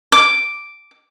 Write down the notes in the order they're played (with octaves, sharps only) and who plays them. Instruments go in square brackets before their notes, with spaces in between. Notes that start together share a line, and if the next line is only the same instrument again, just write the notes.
[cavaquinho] D6